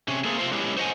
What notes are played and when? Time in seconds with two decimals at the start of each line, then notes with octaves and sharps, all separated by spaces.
0.08 C3 C#4
0.24 A3 A#3 C4 G#4
0.38 C3 C4 F4 C5
0.52 F#3 G#3 B3 C#4 E4 G4
0.77 C5 C#5 D#5 F#5 G#5